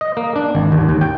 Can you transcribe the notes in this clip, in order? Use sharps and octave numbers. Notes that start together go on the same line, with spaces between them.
D#5
A#3
D4
G#1
D#2
D#2
G5